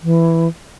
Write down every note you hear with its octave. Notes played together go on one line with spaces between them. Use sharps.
E3